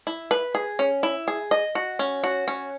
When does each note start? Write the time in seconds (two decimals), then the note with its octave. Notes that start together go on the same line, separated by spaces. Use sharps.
0.07 E4
0.31 B4
0.55 G#4
0.79 C#4
1.03 E4
1.28 G#4
1.51 D#5
1.75 F#4
1.99 C#4
2.24 F#4
2.48 C#4